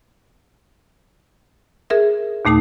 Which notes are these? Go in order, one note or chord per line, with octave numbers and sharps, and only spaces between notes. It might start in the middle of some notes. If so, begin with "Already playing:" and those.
G#4 A#4 E5
D#2 A#2 A3 D#4 A5